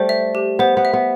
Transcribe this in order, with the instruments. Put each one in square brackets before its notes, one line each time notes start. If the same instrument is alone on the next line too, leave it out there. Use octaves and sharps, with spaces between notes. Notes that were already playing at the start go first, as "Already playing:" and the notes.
Already playing: [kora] G3 A3 [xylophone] C5
[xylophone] E5
G4
[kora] B3 [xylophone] C5
[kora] B3
[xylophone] E5
[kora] B3